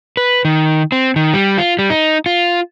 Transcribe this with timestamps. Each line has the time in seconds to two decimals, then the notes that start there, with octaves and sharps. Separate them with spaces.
0.17 B4
0.45 D#3
0.92 C4
1.16 D#3
1.34 G3
1.58 F4
1.79 G3
1.90 D#4
2.26 F4